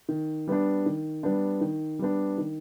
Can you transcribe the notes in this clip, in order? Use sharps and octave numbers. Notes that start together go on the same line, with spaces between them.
D#3
G3 B3 D4
D#3
G3 B3 D4
D#3
G3 B3 D4
D#3